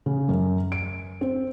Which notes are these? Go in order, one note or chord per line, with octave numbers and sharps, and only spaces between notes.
C#3
F#2
D7
C4